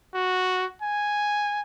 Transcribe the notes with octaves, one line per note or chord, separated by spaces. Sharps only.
F#4
G#5